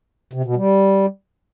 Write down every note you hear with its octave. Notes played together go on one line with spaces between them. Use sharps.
C3
B2
G3